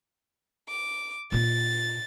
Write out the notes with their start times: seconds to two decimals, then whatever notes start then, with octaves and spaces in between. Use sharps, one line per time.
0.69 D6
1.32 A#2 F4 A6